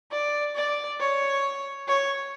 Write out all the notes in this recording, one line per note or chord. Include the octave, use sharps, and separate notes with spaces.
D5
D5
C#5
C#5